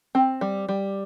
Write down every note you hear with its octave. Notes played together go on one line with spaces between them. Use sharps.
C4
G3
G3